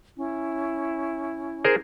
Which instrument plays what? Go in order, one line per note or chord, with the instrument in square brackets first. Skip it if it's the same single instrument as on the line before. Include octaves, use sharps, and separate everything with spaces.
[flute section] C#4 E4
[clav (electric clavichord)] G#4 A#4 C5